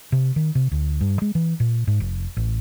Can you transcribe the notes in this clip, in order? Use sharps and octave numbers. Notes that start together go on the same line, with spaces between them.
C3
D#3
C3
D2
G2
G#3
E3
A#2
G#2
F1
A1